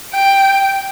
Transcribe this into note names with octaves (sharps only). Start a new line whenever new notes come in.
G5